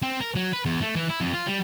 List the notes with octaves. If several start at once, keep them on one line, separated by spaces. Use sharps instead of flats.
C4
A#4
F#3
B4
E2
A3
E3
E4
F2
F4
G3